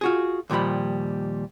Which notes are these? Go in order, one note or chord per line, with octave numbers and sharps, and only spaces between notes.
F4 F#4 G#4
D#2 A#2 F3 G3 B5